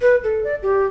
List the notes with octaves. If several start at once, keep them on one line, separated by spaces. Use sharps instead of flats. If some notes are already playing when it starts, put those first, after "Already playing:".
B4
A4
D5
G4